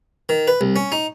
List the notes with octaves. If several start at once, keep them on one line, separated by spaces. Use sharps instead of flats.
D#3
B4
C2
C#4
D#4